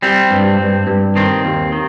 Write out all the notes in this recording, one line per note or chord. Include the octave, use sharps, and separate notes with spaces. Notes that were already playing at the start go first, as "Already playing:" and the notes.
G3 C4
G2
G2
G2
D#3 C4
D#2
D#3